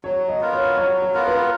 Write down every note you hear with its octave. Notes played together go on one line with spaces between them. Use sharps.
F#3 C#5
D#5
B3 F4 A#4
C#5
F#3 C#5
C#5
B3 F4 A#4
B4